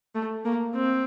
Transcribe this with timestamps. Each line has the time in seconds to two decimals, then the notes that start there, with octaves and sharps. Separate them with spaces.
0.15 A3
0.45 A#3
0.74 C4